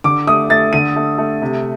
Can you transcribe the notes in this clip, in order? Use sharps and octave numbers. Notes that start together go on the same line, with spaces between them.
D3 D6
A3 D#6
A3 A6
D3 D#7
A3
A3
C3